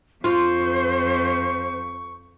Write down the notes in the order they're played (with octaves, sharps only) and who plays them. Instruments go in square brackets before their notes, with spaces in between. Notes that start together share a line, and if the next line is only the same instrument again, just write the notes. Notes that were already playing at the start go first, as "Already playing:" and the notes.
[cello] F2 [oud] F4 [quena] C5 [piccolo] C#6